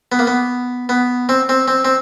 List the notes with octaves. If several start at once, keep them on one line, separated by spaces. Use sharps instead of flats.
B3
A#3
B3
B3
C4
C4
C4
C4